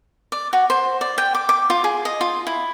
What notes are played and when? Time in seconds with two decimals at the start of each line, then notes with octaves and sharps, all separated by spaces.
0.32 D5
0.53 F#4
0.70 C5
1.01 D5
1.18 G5
1.35 D6
1.49 D6
1.70 F4
1.84 G#4
2.05 D#5
2.21 F4
2.47 E4